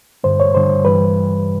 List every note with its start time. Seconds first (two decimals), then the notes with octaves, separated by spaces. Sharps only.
0.24 G2 D3 G3 C5
0.40 C#5
0.54 G2 D3 G3 C5
0.84 G2 E3 G3 B4